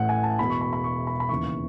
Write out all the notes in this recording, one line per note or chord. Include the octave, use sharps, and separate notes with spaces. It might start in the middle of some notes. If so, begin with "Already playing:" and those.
Already playing: A1 A2 E3 F#5
G#5
A5
E1 E2 B2 B5
C#6
B5
B5
C#6
B5
B5
D#2 C#3 E3 C#6